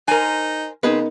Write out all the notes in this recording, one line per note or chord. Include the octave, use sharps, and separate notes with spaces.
D#4 A#4 C5 G#5
C#3 B3 C4 D#4 G#4 A#4 B4